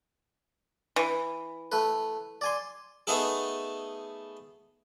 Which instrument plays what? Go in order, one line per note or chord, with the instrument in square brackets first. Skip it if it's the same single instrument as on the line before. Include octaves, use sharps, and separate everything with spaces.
[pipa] E3
[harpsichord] A3 B4
D5 G#5 C6
A3 B3 D#4 G#4 A4